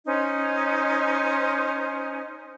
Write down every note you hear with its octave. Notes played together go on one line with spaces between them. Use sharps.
C#4 D#4 C5